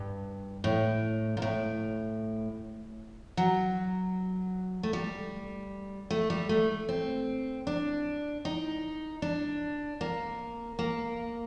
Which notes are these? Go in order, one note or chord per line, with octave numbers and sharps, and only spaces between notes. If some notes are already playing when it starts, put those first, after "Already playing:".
Already playing: G2
A2
A#2
A2
F#3
A3
G3
A3
G3
A3
C4
D4
D#4
D4
A#3
A#3